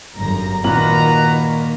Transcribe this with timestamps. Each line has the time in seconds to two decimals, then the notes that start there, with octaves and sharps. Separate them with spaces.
0.17 G1 F#2 A#5
0.64 A#2 D#3 A#3 F#4 B4 A#5 F#7